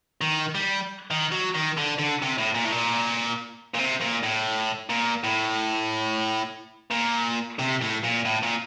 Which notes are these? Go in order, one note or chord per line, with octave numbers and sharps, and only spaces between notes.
D#3
G3
D#3
F#3
D#3
D3
D3
C3
A2
A#2
A2
A#2
A#2
C3
A#2
A2
A#2
A2
A#2
C3
A2
A#2
A2
A#2